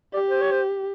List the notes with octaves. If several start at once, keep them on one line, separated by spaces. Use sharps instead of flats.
G4 D5
C5
C#5
C5